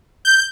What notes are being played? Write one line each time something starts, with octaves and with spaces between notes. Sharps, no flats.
G6